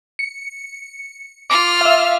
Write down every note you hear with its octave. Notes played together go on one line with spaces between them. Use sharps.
C#7
F4 D6 F6
E5 F5